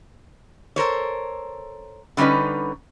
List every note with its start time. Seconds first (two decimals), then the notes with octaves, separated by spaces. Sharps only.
0.76 A4 A#4 C5 C#5
2.17 D3 G3 C#4 D#4 B4